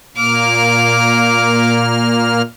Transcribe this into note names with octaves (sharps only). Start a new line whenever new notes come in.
A#2 A#3 D6 F6